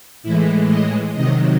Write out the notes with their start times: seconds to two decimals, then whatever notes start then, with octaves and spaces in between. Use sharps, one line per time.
0.23 A2 E3 G#3 E4
0.69 D#5
1.14 C3 D#3 F#3 D#5